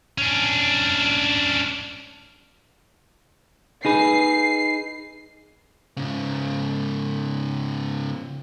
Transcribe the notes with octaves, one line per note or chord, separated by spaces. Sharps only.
C#4 D4
D#4 G#4 B4 C7
G#2 C#3